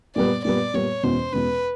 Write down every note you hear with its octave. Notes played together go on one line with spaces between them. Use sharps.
A#2 G3 B3 D5
A#2 G3 B3 D5
A#2 G3 B3 C#5
E2 B2 G#3 C#4 C5
E2 B2 G#3 C#4 B4